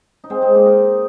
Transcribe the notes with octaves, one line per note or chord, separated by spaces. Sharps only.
D#4
G#3 C4
G#3 C4
A#3 D#4
A#4 D#5